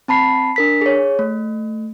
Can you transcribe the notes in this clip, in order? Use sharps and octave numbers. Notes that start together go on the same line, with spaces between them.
C4 A5 B5 C7
D4 A#4 B6
G#4 C#5
A3